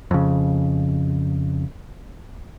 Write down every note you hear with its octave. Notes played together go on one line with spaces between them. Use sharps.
F2 C#3